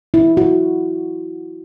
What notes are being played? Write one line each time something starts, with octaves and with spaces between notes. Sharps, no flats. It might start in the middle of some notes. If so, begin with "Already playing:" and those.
E4
F#4